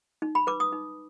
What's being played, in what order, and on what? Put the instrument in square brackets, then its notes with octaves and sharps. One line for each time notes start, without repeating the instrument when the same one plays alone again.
[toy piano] D#4
B5
B4 D6
D#6
D#4